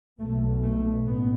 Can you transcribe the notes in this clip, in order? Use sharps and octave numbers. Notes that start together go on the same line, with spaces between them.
B1 B2 A3
A3
A1 B3